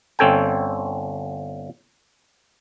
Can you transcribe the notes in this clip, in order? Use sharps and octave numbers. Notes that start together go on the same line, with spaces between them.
G1 C4 C#4 A4 G5 G#5